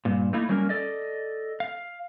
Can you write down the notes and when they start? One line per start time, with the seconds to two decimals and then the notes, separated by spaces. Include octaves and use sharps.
0.05 G2 A#2
0.33 A3 A#3 D#4 E4
0.49 F#3 G3 A#3 C#4 F4 A#4
0.69 A4 D5 D#5
1.60 F5